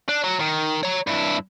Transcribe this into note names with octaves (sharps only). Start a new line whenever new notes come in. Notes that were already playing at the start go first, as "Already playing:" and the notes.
D4
F#3
D#3
C#5 A#5
G2 E4